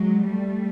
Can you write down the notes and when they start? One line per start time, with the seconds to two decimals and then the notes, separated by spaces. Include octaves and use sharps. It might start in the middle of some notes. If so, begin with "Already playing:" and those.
Already playing: F#3 G#3
0.24 G3 A3